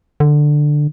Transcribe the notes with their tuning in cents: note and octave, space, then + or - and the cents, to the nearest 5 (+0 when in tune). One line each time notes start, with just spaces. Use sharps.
D3 +10